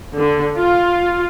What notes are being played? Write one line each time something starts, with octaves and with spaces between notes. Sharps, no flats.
D3
F4